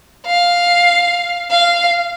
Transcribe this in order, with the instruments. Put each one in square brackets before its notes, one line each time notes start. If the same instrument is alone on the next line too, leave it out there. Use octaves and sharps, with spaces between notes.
[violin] F5
F5